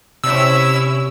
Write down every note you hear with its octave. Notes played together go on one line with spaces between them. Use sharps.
C3 C#4 E4 E6